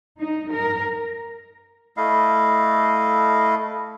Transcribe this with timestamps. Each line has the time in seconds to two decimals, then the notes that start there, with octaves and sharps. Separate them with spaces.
0.19 D#4
0.51 A#4
1.97 A3 E4 D#5 F5